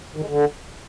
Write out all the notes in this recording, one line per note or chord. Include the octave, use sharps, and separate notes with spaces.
D#3
G#3
D3